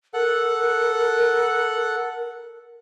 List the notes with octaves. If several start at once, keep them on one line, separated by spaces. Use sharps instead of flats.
A4 A#4 F#5 F#6